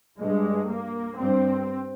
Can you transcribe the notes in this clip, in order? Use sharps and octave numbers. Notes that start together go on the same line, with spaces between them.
G2 G#3
A#3
G2 C4